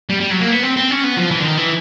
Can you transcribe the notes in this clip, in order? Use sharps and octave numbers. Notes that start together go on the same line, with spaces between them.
G3
G3
F#3
A#3
B3
C4
C4
C#4
B3
F3
E3
D3
D#3
E3